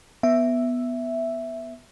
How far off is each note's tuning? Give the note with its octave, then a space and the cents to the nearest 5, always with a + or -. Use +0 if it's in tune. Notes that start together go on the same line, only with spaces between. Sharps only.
B3 +0 E5 +0